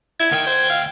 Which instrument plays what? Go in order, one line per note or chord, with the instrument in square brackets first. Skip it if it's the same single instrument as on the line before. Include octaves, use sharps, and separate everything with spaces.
[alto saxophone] E4 [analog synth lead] G#6
[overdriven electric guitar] D2 G5 [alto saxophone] D#3
[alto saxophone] C5
F5